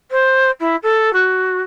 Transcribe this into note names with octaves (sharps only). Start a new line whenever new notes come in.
C5
E4
A4
F#4